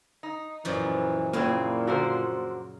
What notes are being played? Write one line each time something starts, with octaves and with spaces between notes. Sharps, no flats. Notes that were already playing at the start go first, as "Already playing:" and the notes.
D#4
F#2 A#2 E3 F3
E2 A#2 C#3 A#3 C4 E4 G#5
D3 F3 F#4 A#4 C5